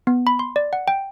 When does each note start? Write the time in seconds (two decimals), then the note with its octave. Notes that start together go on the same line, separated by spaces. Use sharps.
0.07 B3
0.27 B5
0.39 C6
0.56 D5
0.73 F#5
0.88 G5